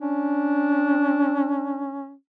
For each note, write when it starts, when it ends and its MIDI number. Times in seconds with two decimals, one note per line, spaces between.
0.01 2.14 61
0.01 1.98 62